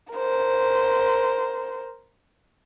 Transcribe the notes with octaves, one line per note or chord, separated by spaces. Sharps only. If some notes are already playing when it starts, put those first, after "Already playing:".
A#4 C5